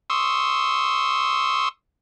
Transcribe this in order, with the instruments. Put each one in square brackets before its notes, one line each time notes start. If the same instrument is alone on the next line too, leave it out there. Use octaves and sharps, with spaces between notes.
[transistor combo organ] C6 C#6 D#6 E6